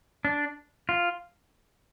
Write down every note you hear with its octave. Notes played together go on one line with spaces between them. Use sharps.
D4
F4